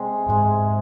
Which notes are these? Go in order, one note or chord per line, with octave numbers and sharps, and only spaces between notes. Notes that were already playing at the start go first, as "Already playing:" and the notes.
Already playing: C3 G#3
G#2 G#3